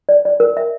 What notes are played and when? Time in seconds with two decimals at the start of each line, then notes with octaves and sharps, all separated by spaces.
0.09 D5
0.25 D5
0.40 A#4
0.57 E5